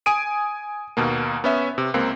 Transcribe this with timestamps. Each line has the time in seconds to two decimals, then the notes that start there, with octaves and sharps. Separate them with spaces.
0.06 G#5 D#6 D7 D#7
0.97 D#2 B2 A#3
1.44 B3 C#4 E5
1.78 C3
1.94 C#2 A#3 C4